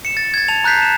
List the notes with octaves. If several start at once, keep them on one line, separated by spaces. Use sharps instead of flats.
C#7 E7
A6
G#6 A6
A5 F7
A#5 F#6 G6 B6 C7
A5 E7